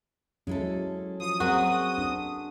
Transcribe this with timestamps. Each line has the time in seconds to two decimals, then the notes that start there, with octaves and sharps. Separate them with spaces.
0.47 F#3 G#3 C#4 E4 A4
1.20 F3 D#6
1.40 F#3 C4 F#4 G#4 A#4
1.98 D4